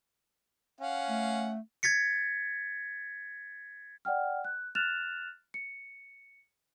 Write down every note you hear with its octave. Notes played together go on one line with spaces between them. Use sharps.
C#4 F5 F#5
A3
G#6 A6 B6 C#7
D5 F#5 G5 F6
F#6
F6 F#6 A6 E7 F7
C#7